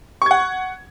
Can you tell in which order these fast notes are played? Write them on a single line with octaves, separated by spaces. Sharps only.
C#6 G#6 F#5